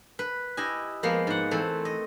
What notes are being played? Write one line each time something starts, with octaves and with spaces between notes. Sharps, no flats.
B4
E4 G4 D#5 G#5
F3 G#3 A#3 B3
G#2 F#5
E3 A3 C4
D#5